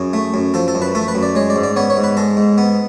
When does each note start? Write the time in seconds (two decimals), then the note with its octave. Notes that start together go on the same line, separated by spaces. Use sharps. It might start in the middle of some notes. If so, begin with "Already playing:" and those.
Already playing: F#2 G#4
0.13 A3
0.34 F#2
0.54 F3 A4
0.68 A4
0.75 F#2
0.82 B4
0.95 A3 A4
1.08 B4
1.15 F#2
1.23 D5
1.35 G#3 C#5
1.50 D5
1.56 G#2
1.63 D5
1.76 B3 C#5
1.90 C#5
1.97 G#2
2.04 B4
2.17 G#3 A4
2.37 G#2
2.58 B3